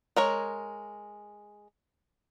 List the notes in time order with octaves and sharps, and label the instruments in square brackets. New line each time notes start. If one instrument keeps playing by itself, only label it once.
[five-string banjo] G#3 A#4 C#5